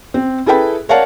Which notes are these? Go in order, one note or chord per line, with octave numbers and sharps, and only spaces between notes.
C4
E4 G#4 A4 B4 G5 B5
A#4 C#5 D5 F5 F#5 A5